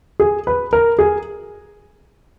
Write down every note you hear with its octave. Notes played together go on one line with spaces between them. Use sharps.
G#4
B4
A#4
G#4